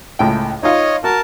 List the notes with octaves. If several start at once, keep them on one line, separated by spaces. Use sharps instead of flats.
C#2 A2 G5
D#4 F4 C#5 D#5
F#4 A#4 A5